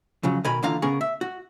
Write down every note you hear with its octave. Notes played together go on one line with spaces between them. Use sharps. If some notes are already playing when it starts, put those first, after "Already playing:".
F2 C#3 F#3
B2 D#3 A#4 G#5 B5
D#2 D3 E3 F4 F5 A#5
C#3 B3 C#4 G#4 A#4
E5
F#4